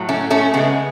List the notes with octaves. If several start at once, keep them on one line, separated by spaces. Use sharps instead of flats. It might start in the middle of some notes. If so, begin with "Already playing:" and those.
Already playing: A2 F#3
A3 C#4
A3 C#4
C#3 G#3 B3